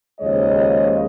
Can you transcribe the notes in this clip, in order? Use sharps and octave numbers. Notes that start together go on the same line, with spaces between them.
D#2 C#3 F3 G#3 C#5 D#5